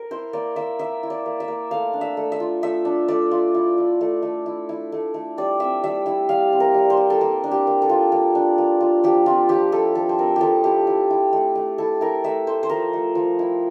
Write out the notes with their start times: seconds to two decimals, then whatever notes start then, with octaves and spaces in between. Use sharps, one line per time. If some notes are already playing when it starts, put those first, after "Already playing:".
Already playing: A#4
0.11 E4 C5
0.33 A#3 D5
0.56 A#3 E5
0.79 E4 E5
1.03 E4
1.10 D5
1.26 A#3
1.40 E5
1.48 A#3
1.71 A3 F5
1.93 D4
2.01 E5
2.17 A3
2.32 E5
2.40 F4
2.63 A3 E5
2.85 D4
3.08 A3 D5
3.31 F4
3.55 E4
3.78 E4
4.01 A3
4.22 A3
4.46 E4
4.69 E4
4.92 A3
5.14 A3
5.38 G3 D5
5.60 C4 E5
5.84 G3 E5
6.06 E4 E5
6.29 G3 F5
6.53 C4
6.60 A#4
6.74 G3
6.90 C5
6.97 E4
7.10 A4
7.21 A#3 A#4
7.44 D4
7.51 G4
7.67 A#3
7.82 A4
7.89 F4
8.12 A#3
8.35 D4
8.58 A#3
8.81 F4
9.04 F3 G4
9.26 C4 F4
9.49 F3 G4
9.72 E4 A4
9.95 F3 A4
10.09 C5
10.18 C4 A#4
10.36 F3 G4 A4
10.64 E4 G4
10.87 E4
11.10 E4
11.33 A3
11.55 A3
11.78 E4 A4
12.01 E4 A#4
12.24 A3 E5
12.47 A3 C5
12.63 C5
12.69 F3 A#4
12.93 A3
13.15 F3
13.39 E4